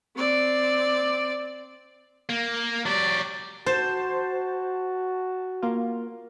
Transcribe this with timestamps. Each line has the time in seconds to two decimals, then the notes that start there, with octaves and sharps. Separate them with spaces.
0.16 C4 D5
2.30 A#3
2.86 F#3 G4 D5
3.66 F#4 C5 A5
5.62 A#3 F4